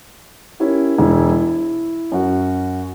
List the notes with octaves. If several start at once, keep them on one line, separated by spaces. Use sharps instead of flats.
C#4 E4 G4 A#4
E1 E4
E4
F#2 F#4